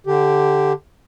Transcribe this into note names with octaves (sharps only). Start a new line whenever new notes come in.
D3 G4